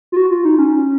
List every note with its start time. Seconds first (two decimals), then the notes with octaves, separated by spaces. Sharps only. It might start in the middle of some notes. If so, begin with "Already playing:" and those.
0.12 F4
0.16 F#4
0.31 F4
0.45 D#4
0.58 C#4